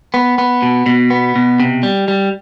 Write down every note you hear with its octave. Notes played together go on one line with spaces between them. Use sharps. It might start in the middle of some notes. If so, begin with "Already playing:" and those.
B3
B3
B2
B2
B3
B2
C3
G3
G3